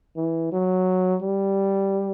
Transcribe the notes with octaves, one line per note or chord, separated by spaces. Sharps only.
E3
F#3
G3